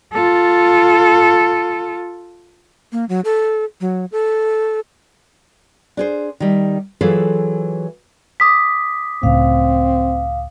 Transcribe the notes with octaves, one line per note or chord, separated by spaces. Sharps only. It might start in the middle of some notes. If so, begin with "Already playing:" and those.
F4 A4
A#3
F#3
A4
F#3
A4
D4 G#4 C5
D#3 G3
E3 F#3 F4 G#4 A4
D6 D#6 B6
C#2 A2 C4 F5